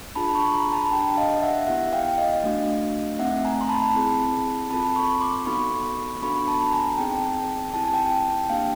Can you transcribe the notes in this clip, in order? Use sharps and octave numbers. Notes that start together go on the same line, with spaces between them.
D4 F4 G#4 A5 B5
B5 C#6
B5
A#5 C6
A5 B5
D4 G4 G5 A5
D#5 F5
E5 F#5
B3 E4 G4 E5 F#5
F5 G5
D#5 F5
A3 D4 F#4
A3 C4 D#4 E5 F#5
G#5 A#5
C6
A5 B5
C4 E4 G#4
C4 F4 A4 A5 B5
B5 C#6
C6 D6
B3 D#4 F#4 A4 B5 C#6
B3 D4 F#4 A4 B5 C#6
A5 B5
G#5 A#5
C4 D#4 G#4 G5 A5
C4 E4 G4 A5
G#5
G5 A5
A#3 D4 G4 F5 G5